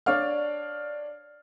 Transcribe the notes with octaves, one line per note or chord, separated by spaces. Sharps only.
D4 C#5 D5 F5 F6